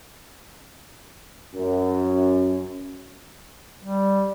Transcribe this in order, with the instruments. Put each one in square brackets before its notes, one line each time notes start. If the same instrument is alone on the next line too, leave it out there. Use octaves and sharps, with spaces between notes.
[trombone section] F#2
[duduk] G3